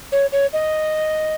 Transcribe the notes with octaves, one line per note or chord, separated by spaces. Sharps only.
C#5
C#5
D#5